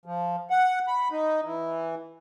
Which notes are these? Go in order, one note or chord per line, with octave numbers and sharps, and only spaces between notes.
F3
F#5
B5
D#4
E3